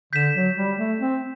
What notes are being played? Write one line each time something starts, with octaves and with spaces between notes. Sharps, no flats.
D3 G6 B6 E7
F#3
G3
A3
C4